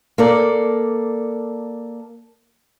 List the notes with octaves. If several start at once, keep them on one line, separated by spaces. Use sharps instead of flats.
A#3 A4 D5